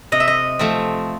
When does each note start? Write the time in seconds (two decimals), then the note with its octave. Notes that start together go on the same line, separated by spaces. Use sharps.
0.12 C3 D#5
0.20 E5
0.28 D#5
0.59 F3 A3 C4